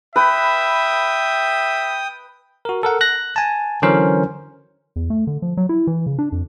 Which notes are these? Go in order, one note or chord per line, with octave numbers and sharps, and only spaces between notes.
B4 E5 G5 D#6
F#4 A#4
A4 A#4 F#5
F#6 A#6
G#5 A5
D3 E3 F#3 C#4 A#4 C5
E2
A3
D3
F3
F#3
E4
E3
C#3
D4
F2